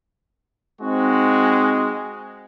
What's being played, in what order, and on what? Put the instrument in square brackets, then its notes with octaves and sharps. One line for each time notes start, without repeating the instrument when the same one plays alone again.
[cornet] G#3 [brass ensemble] C4 D#4 F#4